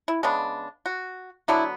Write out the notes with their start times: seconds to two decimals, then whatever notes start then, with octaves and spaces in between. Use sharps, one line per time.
0.08 E4
0.23 C#3 G#3 B3 D4
0.86 F#4
1.48 D3 F#3 B3 D4 E4